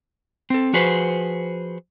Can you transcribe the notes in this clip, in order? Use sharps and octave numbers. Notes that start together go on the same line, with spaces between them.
C4 A4
F3 F#4 G#4 B4 C5